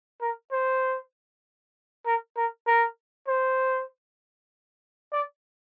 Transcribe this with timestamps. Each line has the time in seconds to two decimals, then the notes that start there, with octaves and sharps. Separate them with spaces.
0.21 A#4
0.52 C5
2.06 A#4
2.37 A#4
2.67 A#4
3.28 C5
5.12 D5